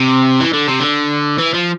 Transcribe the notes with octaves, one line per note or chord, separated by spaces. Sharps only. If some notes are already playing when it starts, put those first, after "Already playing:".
Already playing: C3
E3
D3
C3
D3
E3
F3